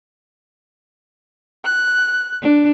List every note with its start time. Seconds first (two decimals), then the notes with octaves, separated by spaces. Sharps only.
1.65 F#6
2.42 D4